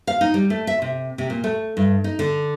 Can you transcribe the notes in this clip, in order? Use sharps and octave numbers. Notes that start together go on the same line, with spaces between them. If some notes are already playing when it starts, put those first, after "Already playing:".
F5
D#4
G3
A3
E5
C3
C3
A#2
A3
G2
D#4
D3